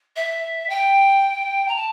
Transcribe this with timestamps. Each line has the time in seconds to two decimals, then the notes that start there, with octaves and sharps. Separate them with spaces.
0.16 E5
0.69 G5
1.68 A#5
1.76 A5